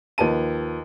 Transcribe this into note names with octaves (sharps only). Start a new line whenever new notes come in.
D#2 F3 B4 A5 D#7